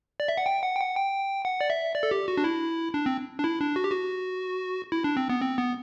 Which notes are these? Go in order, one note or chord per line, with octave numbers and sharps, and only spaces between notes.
D5
E5
F#5
G5
F#5
G5
F#5
G5
F#5
D5
E5
D5
A4
G4
F#4
D4
E4
D4
C4
D4
E4
D4
F#4
G4
F#4
E4
D4
C4
B3
C4
B3